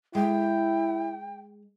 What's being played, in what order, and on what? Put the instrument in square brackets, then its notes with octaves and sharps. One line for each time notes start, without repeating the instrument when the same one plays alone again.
[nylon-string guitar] G#3 [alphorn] E4 [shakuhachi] G5